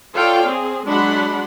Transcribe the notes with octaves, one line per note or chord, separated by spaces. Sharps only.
F4 A4 C#5 D5 F5 G5
C4 G#4
F#3 G#3 D4 F#5 B5 C6